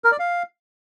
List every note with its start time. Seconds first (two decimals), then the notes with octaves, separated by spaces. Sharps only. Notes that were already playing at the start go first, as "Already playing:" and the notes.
0.04 A#4
0.12 D5
0.19 F5